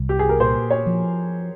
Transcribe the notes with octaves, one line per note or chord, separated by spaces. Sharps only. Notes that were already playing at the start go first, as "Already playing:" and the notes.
Already playing: C2
G4
G#4
A#4
A#2 C5
C#5
F3